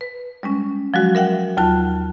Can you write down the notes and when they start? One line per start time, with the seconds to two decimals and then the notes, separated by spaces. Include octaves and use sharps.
0.01 B4
0.43 G3 G#3 C#4
0.94 F3 F#3 G#3 F#4
1.15 A#4 E5 F#5 G5
1.57 D#2 F#3 F4 A5 F#6